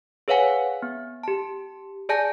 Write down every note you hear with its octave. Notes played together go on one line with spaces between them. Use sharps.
G#4 B4 C#5 F5 F#5 G#5
B3
G4 A5
G#4 D5 G#5 A5 G6 A#6